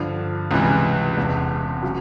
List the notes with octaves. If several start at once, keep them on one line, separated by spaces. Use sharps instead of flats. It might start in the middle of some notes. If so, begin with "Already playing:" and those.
Already playing: G2 D3 F3
C#2 C3 E3 G3
E1 E2 C3
C#3 F#3